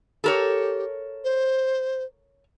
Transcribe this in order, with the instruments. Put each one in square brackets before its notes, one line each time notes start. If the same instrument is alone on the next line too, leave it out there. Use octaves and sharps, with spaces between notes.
[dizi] G4 [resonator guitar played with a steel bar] A4 A#4 C#5
[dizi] C5